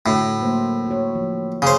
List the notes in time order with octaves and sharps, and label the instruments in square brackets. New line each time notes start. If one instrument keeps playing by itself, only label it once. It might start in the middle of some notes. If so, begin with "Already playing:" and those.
[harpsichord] A2 [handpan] D3 D4 F#4
[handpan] F#3 A#3 C5
F#4 C#5
F3
[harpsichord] C#3 C5